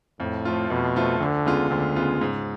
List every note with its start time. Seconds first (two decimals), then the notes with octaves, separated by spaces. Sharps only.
0.19 F2 A2
0.45 F3 A3 F4
0.70 F2 B2
0.96 F3 A3 F4
1.20 D2 D3
1.45 C#3 G#3 B3 F4
1.70 D2 D3
1.96 C#3 G#3 B3 F4
2.21 G#2 C#3